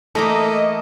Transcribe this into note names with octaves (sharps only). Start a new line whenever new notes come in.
E3 A3 A#3 D#4 A4 D#5 D6